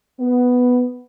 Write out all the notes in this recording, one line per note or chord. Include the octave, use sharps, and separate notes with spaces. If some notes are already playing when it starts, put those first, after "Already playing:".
B3